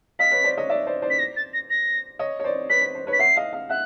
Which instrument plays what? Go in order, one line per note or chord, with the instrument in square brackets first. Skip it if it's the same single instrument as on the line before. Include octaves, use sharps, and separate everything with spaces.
[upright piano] D#5 F5 [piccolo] B6
[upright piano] B4 C#5
C5 D5
C#5 D#5
D5 E5
C5 D5
C5 D5
[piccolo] B6
A#6
A6
A#6
A#6
[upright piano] C#5 D#5
C#5
C5 D5
[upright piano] B4 C#5 [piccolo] B6
[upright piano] C5
C5
B4 C#5
[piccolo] B6
[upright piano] E5 F#5 [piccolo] C7
[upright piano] D#5 F5
D#5 F5
[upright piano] E5 F#5 [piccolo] F#6